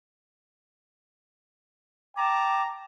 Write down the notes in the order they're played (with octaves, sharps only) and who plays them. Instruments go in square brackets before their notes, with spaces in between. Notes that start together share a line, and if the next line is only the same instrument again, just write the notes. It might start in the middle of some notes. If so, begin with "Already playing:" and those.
[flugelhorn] G5 [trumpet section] A5 A#5 [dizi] D6